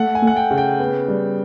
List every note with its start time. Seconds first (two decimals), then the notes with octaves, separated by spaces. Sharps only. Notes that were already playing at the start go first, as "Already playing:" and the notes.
Already playing: A3 F#5
0.15 G#5
0.22 A3
0.27 F#5
0.36 G5
0.51 C#3
0.58 G5
0.79 B3
1.08 G3